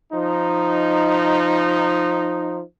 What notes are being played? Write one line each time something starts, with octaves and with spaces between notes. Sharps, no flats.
F3 D#4